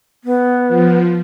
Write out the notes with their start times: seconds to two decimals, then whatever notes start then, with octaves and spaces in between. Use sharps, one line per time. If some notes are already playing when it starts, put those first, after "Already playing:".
0.24 B3
0.68 F3